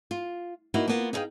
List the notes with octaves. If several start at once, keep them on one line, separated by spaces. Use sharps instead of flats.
F4
A#3 B3 D#4 E4 F#4
A#3 B3 F4
D#4 E4 G#4 D5 F5 G5